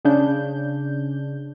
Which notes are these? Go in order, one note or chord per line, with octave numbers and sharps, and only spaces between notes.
C#3 D4 G6